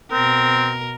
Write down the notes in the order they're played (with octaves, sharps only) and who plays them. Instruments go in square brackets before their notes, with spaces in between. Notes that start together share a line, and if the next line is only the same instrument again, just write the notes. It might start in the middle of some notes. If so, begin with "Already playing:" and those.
[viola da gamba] B2 A#4 [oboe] C4